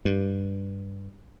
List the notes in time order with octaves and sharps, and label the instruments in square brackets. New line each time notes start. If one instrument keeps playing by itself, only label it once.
[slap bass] G2